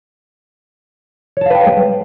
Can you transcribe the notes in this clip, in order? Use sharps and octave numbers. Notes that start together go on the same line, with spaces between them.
B4 C#5 F5 G5 A5